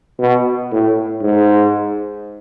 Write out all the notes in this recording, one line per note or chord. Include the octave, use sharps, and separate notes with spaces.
B2
A2
G#2